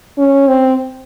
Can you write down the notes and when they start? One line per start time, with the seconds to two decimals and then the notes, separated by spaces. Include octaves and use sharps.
0.18 C#4
0.48 C4